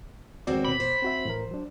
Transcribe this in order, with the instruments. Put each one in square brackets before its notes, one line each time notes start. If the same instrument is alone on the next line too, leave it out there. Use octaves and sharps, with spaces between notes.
[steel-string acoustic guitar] D#2 C4 F#4 [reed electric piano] G#3 B3 D5
[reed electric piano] B2 D6 [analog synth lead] B5
[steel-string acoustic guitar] C5
[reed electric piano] C4 F#4 E5
A2 E3 A#4
F#3 D4